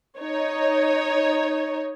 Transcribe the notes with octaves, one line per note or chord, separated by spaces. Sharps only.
D#4 C#5